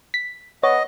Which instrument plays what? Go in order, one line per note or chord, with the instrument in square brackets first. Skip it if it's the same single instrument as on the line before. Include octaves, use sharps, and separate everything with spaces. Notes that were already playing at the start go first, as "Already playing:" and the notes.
[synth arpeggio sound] B6
[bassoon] B3 [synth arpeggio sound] C#5 [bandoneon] D#5